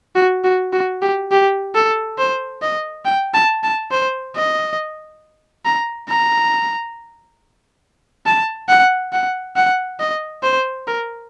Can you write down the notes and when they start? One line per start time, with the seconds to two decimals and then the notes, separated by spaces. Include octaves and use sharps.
0.15 F#4
0.44 F#4
0.72 F#4
1.02 G4
1.31 G4
1.75 A4
2.18 C5
2.62 D#5
3.05 G5
3.34 A5
3.63 A5
3.91 C5
4.36 D#5
5.65 A#5
6.09 A#5
8.26 A5
8.69 F#5
9.13 F#5
9.56 F#5
10.00 D#5
10.43 C5
10.87 A#4